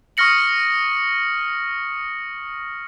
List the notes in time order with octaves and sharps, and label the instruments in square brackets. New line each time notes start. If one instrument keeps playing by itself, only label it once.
[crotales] C#6 D#6 F6 A#6 C#7 F#7